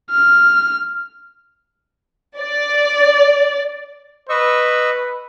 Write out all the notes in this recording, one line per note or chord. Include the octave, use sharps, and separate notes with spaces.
F6
D5
B4 D#5 C#6 E6